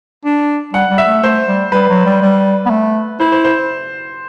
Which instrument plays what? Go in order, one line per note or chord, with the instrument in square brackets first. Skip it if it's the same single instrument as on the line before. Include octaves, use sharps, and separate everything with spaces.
[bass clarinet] D4
[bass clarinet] G3 [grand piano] F#5
[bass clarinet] G3
[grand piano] E5
[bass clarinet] A3
[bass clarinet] A3 [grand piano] C5
[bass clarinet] G3
[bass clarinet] G3 [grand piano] B4
[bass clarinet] F#3
G3
G3
B3
A3
[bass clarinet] E4 [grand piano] C5
[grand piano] C5
C5